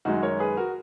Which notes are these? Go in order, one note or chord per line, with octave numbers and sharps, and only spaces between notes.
F#2 D#3 G#3 D#4 F#4
A#4 C#5
G#4 B4
F#4 A#4